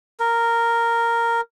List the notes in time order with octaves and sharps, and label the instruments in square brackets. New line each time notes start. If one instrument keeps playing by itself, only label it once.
[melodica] A#4